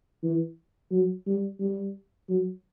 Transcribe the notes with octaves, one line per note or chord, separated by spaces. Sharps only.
E3
F#3
G3
G3
F#3